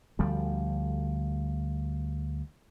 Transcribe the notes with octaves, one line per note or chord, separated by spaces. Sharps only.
D2 F3 G3